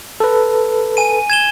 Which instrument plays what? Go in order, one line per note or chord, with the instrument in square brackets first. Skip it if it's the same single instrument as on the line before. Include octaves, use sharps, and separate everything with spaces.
[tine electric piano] A4 B4
[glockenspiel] G#5 D#7
G#6 E7 G7